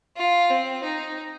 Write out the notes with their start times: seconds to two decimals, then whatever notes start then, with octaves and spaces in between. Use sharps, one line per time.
0.16 F4
0.50 C4
0.84 D#4